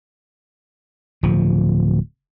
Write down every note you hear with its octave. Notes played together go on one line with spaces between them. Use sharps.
D1 F3